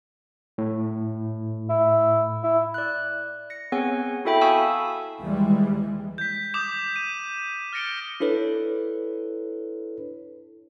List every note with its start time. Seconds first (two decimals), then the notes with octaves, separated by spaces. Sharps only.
0.58 A2
1.69 E4
2.44 E4
2.74 D5 F#6
3.50 A#6 C#7
3.72 B3 C4 G#4 C#5 F#5 G#5
4.25 E4 F#4 A4 E5 G5 B5
4.41 F5 G#5 A5 C#6 D#6 E6
5.22 D#2 E3 G3 G#3
6.18 G6 B6
6.54 D6 D#6 G6 E7
6.96 D#7
7.73 F6 A6 A#6 C#7 D7 G7
8.20 D4 E4 A4 B4 C#5